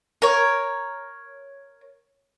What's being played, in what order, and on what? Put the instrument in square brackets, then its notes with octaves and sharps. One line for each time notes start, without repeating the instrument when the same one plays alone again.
[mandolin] A#4 C#5